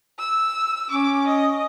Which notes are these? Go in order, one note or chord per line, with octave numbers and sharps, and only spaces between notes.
E6
C#4 D6
D#5